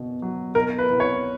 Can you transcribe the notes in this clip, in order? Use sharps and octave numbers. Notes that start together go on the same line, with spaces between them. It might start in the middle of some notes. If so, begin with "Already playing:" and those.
Already playing: F#1 B2
F#3
B2 A#4
B4
C2
C#5